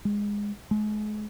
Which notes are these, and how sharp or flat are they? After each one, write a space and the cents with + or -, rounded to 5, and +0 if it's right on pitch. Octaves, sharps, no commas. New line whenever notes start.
G#3 -15
G#3 +35